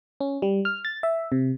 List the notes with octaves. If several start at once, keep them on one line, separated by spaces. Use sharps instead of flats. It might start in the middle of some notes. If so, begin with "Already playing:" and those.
C#4
G3
F6
A6
E5
C3